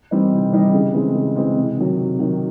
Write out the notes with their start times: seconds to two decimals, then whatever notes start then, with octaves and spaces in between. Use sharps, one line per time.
0.11 E3 G3 C4 D#4
0.33 C3
0.52 E3 G3 C4 D#4
0.74 C#3
0.94 E3 G#3 C4
1.15 C#3
1.36 E3 G#3 C4
1.57 C3
1.77 D#3 F#3
1.98 C3
2.19 D#3 F#3